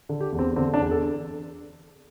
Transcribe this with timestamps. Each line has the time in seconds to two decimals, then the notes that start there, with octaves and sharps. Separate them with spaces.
0.09 D3
0.20 G4
0.32 E2
0.39 C4
0.56 D3 C4
0.74 D4
0.80 E2
0.91 A4